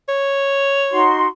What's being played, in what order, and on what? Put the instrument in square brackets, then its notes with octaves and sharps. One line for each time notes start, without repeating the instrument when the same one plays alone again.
[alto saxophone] C#5
[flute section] D#4 F#4 C6